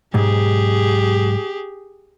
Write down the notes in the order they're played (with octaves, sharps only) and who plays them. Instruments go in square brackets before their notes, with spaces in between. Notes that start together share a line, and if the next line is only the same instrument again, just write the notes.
[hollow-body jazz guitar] B1 G#2 [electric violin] G4 G#4